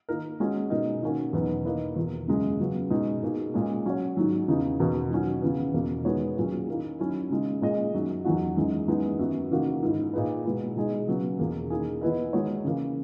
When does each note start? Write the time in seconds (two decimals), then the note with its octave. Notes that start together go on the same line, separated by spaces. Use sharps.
0.09 D#3 A#3 D#4 A#4
0.40 G#3 C#4 F#4
0.70 B2 G#3 D#4 A#4 D#5
1.02 D#3 A#3 C#4 F#4 A#4
1.33 E2 B2 F#3 B3 D#4
1.65 D#3 A#3 E4 B4 D#5
1.96 E2 B2 A#3
2.28 F#2 C#3 G#3
2.60 C#3 F#3 B3
2.90 B2 G#3 D#4
3.23 B2 A#3 D#4 G#4
3.54 A#2 G#3 C#4
3.86 F#3 C#4 F#4 C#5
4.17 G#2 D#3 F#3
4.48 E2 C#3 E3 B3 D#4
4.79 E2 B2 A#3 D#4 F#4
5.10 D#3 F#3 C#4 F#4
5.42 C#3 E3 B3
5.74 E2 B2 A#3
6.04 D#3 G#3 B3 F#4 C#5
6.37 A#2 F#3 C#4 G#4
6.68 D#3 A#3 E4
6.99 D#3 F#3 C#4 E4
7.30 C#3 G#3 D#4
7.62 A#2 G#3 C#4 G#4 D#5
7.93 F#2 D#3 F#3
8.25 E2 D#3 F#3 C#4 F#4
8.57 F#2 E3 G#3 D#4
8.88 F#2 E3 G#3 B3 D#4
9.19 F#2 D#3 F#3 B3 F#4
9.51 C#3 E3 A#3 D#4 F#4
9.83 G#2 D#3 A#3 E4
10.14 A#2 A#3 D#4 G#4 B4
10.45 B2 G#3 B3 E4 B4
10.76 B2 G#3 D#4 G#4 D#5
11.08 C#3 F#3 B3
11.39 E2 B2 A#3 C#4 G#4
11.70 D#3 A#3 E4 G#4
12.01 E3 B3 E4 B4 D#5
12.33 D#3 G#3 D#4 F#4 C#5
12.65 C#3 E3 A#3